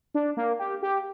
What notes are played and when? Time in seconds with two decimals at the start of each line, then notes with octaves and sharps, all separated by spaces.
0.15 D4
0.37 A#3
0.59 G4
0.82 G4